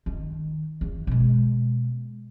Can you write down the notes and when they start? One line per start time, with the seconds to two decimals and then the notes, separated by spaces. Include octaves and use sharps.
0.06 D#3
0.81 E2
1.07 B2 G#3